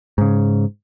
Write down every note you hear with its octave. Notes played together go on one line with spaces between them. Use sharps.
G#2 C#3